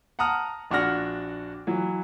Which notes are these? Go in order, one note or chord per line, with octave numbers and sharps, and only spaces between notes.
F#5 A5 A#5 D#6 F6
A#1 D4 F#4 F#5 F6 A#6
E3 F#3